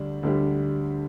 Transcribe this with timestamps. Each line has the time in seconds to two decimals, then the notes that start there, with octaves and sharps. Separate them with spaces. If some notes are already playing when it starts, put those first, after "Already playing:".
Already playing: D2 D3 G3 D4
0.23 D2 D3 G3